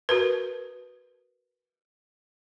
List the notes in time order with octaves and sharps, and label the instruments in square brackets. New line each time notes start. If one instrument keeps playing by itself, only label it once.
[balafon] F#4 A#4 B4